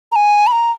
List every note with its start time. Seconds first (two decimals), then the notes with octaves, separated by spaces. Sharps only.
0.12 A#5
0.16 G#5
0.47 B5
0.52 A#5